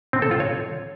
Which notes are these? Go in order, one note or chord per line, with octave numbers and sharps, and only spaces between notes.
C4
A4
F4
C#5